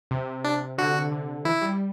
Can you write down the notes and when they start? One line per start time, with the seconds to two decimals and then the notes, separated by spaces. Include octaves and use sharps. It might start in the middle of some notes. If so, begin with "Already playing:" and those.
0.11 C3
0.44 D4
0.78 D3 F#4
1.12 D3
1.45 E3 E4
1.62 G3